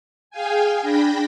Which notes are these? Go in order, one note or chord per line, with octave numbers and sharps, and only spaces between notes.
G#4 F5 G5 G#5
D4 G5 B5 A#6